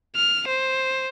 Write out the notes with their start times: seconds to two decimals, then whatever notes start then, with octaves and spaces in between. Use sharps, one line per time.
0.16 F6
0.47 C5